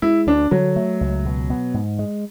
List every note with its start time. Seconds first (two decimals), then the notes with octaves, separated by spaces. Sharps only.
0.02 G#3 E4
0.27 D2 D4
0.51 D3 F#3
0.76 A3
1.01 C#2
1.26 B2
1.50 B3
1.74 G#2
1.99 G#3